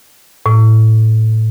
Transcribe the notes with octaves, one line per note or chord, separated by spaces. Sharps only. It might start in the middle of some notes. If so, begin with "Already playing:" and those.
A2